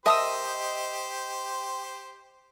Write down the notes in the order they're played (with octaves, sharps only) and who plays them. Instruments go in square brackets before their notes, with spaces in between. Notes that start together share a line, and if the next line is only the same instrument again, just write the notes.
[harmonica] G4 C5 [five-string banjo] A#4 E5 A5 [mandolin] D#5 D#6 E6